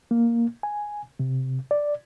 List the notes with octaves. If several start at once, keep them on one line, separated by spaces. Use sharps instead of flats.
A#3
G#5
C3
D5